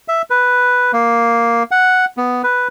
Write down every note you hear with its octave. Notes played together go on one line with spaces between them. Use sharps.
E5
B4
A#3
F#5
B3
B4